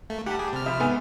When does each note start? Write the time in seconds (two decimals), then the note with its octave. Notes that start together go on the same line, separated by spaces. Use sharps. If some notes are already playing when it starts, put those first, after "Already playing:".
0.10 A3 A#3
0.26 D#3 G3 G4 F#5 G5 A5
0.39 G3 G#4
0.53 C3 F6
0.66 F3 E5 A5 B5
0.80 G#2 B3 A4 G#5